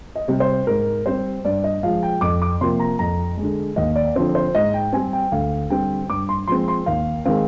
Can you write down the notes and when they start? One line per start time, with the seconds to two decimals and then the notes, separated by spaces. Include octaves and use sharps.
0.15 D#5
0.28 C3 G3
0.40 C5
0.67 G#2 A#4
1.06 G3 C4 C5
1.45 G2 D5
1.64 D#5
1.83 F3 G#3 F5
2.03 G5
2.21 F2 D6
2.42 D6
2.61 C3 F3 A#3 C6
2.80 A#5
2.99 F2 A#5
3.37 G#3
3.43 D3
3.76 D#2 D#5
3.96 D5
4.16 D3 F3 C4 C5
4.35 C5
4.55 G#2 D#5
4.74 G5
4.93 G3 C4 G#5
5.13 G5
5.32 D2 F5
5.70 D3 G3 C4 G5
6.10 G2 D6
6.29 C6
6.48 F3 G#3 C4 C6
6.68 C6
6.86 D#2 F5
7.25 D#3 G#3 C4 F5